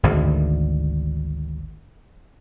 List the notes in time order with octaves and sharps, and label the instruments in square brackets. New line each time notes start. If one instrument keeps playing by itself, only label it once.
[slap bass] G#1 D2